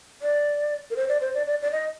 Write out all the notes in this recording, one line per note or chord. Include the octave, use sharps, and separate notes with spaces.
D5
A#4
C5
D5
C5
D5
D5
D5
D#5